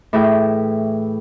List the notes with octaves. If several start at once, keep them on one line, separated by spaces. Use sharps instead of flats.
A2 E3 E4 G#4 G5